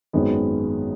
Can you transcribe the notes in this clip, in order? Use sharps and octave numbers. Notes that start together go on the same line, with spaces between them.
G#1 F#2 D#3 G#3 B3